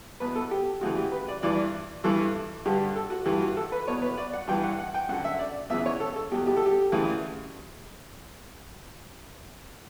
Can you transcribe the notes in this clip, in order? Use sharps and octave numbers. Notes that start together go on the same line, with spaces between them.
E2 B2 B4
A4
G4
D2 C#3 E3 F#4
G4
B4
D5
G2 E3 D5
G2 E3 A4
G2 D3 G4
A4
F#4
G2 E3 G4
F#4
A4
B4
E2 B2 C#5
B4
D5
F#5
G2 E3 G5
F#5
F#5
G5
F#2 D3 F#5
E5
D5
E2 C#3 E3 E5
C#5
A4
A4
E2 B2 G4
G4
A4
G4
D2 C#3 E3